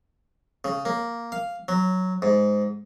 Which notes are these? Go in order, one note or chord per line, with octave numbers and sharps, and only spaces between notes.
C#3
A#3
F5
F#3
G#2